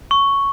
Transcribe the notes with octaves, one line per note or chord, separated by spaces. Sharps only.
C#6